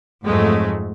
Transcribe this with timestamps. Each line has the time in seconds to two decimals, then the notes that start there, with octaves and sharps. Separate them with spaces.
0.23 F2 G#2 F#3 G#3 A3